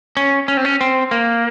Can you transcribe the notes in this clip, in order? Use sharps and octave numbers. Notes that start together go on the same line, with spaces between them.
C#4
C#4
C4
C#4
C4
A#3